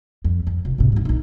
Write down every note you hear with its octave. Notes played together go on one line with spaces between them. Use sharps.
F2
F2
F1
G#1 C3
G#3 D#4
A#1 D#4